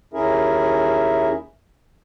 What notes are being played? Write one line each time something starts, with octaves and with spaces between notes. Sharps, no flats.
D#2 C#4 E4 G#4 A#4 E5